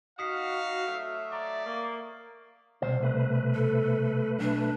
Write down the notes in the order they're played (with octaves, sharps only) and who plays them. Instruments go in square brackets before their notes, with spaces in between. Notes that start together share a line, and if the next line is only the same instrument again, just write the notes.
[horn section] D#4 F#4 [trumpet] F5 [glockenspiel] D#6 B6 C7
[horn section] F#3 A3 E5
[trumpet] D5 [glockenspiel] A#5 C#6
[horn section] A#3
[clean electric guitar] C2 B2 C5
[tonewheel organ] A3 B4
[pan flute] A4
[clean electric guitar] B1 [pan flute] D4